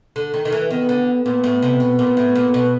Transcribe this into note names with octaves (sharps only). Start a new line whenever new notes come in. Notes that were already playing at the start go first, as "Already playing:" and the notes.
D3
D#3
D#3
E3
D#3 B3
D3
A#2 B3
A2
C3
B2
A#2
A2
A#2
B2